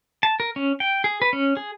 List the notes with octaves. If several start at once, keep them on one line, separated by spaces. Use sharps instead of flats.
A5
A#4
C#4
G5
G#4
B4
C#4
G#4